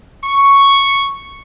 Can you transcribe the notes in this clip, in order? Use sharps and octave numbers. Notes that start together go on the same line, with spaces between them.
C#6